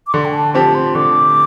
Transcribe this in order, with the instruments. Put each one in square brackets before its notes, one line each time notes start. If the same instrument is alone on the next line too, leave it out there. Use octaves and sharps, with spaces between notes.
[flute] D6
[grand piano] D3 [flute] C6
[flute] G5
A5
[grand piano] F3 C4 G4 [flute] A5
[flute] C6
[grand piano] D3 [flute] D6